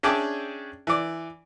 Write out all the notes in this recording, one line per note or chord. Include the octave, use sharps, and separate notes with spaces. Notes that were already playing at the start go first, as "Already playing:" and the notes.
C#4 D4 G#4 D5 E5 G5
E3 D5